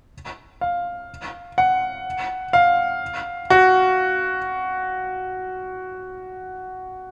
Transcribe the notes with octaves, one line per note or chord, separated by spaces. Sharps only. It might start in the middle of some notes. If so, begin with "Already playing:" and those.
F5
F#5
F5
F#4